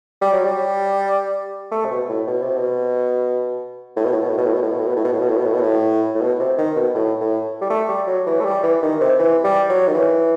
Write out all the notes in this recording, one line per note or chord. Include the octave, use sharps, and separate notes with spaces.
G3
F#3
G3
A3
C3
B2
A2
B2
C3
B2
A2
B2
A2
B2
A2
B2
A2
B2
A2
B2
A2
B2
A2
B2
A2
B2
A2
B2
A2
B2
A2
A2
B2
C3
D#3
B2
A2
A2
G3
A3
G3
F#3
E3
A3
G3
E3
D#3
C3
E3
G3
F#3
D#3
E3